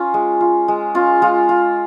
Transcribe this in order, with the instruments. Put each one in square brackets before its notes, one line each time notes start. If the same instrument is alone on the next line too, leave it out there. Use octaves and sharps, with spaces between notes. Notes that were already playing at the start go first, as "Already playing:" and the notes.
Already playing: [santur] C#4 F4
G#3
F4
G#3
C#4 F4
G#3 F4
F4